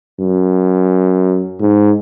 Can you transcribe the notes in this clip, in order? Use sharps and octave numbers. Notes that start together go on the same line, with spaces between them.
F#2
G#2